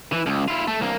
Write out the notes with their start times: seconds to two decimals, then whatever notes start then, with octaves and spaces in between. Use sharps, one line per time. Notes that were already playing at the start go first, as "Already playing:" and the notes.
0.12 E3
0.26 C#2
0.48 E4 F4
0.68 A3
0.81 C2 A#3